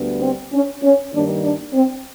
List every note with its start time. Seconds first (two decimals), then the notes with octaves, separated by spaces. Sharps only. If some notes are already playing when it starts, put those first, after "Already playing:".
Already playing: D2 D3 G3 B3
0.22 C4
0.52 C#4
0.82 C#4
1.13 G2 D#3 G3 A#3 D4
1.43 D4
1.73 C4